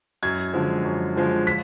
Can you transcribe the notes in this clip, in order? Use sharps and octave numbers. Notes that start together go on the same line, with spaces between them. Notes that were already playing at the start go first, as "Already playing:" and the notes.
F#2 G#6
D3 F3 G#3
F#2
D3 F3 G#3
B6